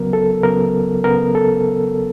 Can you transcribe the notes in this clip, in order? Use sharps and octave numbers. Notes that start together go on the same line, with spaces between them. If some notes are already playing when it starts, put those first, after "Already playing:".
Already playing: C#2 C#3 F#3 B3 A#4
A4
C#2 C#3 F#3 B3 A#4
C#2 C#3 F#3 B3 A#4
A4